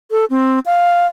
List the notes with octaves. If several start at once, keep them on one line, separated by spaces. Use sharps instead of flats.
A4
C4
F5